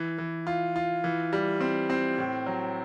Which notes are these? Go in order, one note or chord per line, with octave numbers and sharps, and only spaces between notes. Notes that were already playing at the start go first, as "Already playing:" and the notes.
Already playing: E3
E3
F4
F4
E3
G3
C4
C4
A2
F#3